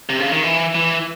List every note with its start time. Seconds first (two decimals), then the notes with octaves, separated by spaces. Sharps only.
0.09 C3
0.20 C#3
0.32 D#3
0.43 E3
0.75 E3